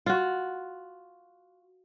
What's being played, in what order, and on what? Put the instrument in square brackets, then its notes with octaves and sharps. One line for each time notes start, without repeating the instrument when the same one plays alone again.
[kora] F4 F#4